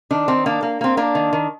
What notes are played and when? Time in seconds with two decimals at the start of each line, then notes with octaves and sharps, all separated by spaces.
0.11 D#3 D4
0.28 D#3 C4
0.46 A#3 D4
0.63 A#3
0.81 A#3 C4
0.97 A#3 D4
1.15 D#3
1.33 D#3